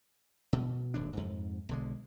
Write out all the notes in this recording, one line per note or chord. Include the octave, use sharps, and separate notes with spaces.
B2
D#1 G#1 F#2 D4
F2 G#2
B1 D3 G#3